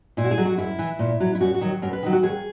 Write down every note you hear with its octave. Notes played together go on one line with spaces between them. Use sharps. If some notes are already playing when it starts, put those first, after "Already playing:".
A#2 E4
F#4
G#4
F#3
F#4
F#2 E4
E3
A#2
F#3
E4
F#2 F#4
F#4
D#3 F#3
F#2 A#4
B4
D#3 F#3
F#4
D#2 G#4